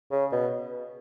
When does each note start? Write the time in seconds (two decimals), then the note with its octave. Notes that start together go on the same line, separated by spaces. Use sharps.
0.11 C#3
0.32 B2